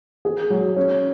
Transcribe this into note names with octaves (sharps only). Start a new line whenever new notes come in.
G#4
F#3
C#4